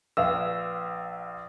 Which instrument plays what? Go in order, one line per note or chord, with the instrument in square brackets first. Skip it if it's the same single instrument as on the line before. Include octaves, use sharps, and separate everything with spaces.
[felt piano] A#1 [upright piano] B4 F5 G5 [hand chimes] E6